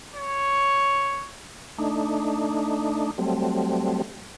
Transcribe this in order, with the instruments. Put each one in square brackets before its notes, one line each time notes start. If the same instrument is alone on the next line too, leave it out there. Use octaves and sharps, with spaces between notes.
[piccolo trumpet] C#5
[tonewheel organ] A3 D4 D#4
F#3 G3 A3 C4